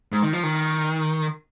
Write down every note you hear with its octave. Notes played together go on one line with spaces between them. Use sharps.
G#2
D#3
F3
D#3